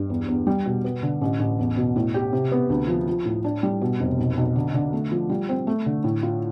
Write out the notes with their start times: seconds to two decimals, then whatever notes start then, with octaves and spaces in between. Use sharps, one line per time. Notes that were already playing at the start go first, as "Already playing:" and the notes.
Already playing: G2
0.10 E2
0.28 E2
0.47 G3
0.66 B2
0.84 B3
1.03 D3
1.21 A1
1.40 A1
1.59 E2
1.77 B2
1.96 A2
2.14 G4
2.33 C3
2.52 B3
2.70 D2
2.88 F3
3.07 F3
3.25 A2
3.44 D4
3.63 G3
3.81 B2
4.00 F1
4.18 B1
4.37 B1
4.56 D3
4.74 D3
4.93 A3
5.12 F3
5.30 G3
5.49 C4
5.67 A3
5.86 D3
6.04 A2
6.23 F4